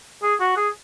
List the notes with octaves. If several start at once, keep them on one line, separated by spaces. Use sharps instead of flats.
G#4
F#4
G#4